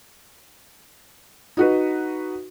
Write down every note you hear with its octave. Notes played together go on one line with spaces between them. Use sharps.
D#4 F#4 B4